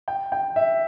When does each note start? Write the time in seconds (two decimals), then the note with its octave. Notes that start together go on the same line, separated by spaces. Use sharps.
0.08 G5
0.32 G5
0.56 E5